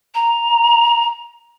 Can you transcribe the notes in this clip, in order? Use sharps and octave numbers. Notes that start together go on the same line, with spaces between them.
A#5